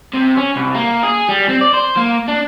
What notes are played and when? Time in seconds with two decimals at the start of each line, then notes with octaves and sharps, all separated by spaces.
0.13 C3
0.37 C#4
0.56 C2
0.74 A#3
1.03 G#4
1.29 G3
1.49 C4
1.61 D5
1.74 C5
1.97 A#3
2.29 D4